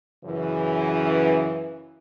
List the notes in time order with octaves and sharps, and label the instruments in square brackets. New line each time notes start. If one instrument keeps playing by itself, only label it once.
[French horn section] F#2 C#3 E3